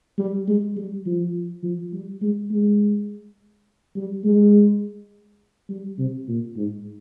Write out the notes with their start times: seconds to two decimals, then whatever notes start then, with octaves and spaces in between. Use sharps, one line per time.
0.19 G3
0.48 G#3
0.76 G3
1.06 F3
1.63 F3
1.93 G3
2.22 G#3
2.51 G#3
3.96 G3
4.24 G#3
5.70 G3
5.98 C3
6.28 A#2
6.57 G#2